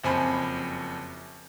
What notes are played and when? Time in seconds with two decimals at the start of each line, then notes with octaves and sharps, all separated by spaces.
0.04 F#1 F2 C5 G#5 B5